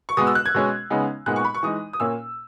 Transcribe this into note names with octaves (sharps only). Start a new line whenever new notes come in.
C#6
B2 G#3 B3 D#6
E6
F#6
G#6
B2 G#3 C#4
C#3 G#3 B3 D#4
A#2 G#3 B3 D#4 F#6
C#6
B5
C#6
E3 G#3 D#4 D#6
D#6
A#2 A#3 C#4 E6